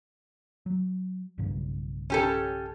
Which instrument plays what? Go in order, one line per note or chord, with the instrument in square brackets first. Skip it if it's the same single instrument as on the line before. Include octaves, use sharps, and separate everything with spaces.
[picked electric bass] F#3
B1 G2 C#3
[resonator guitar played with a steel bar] C#4 G4 A4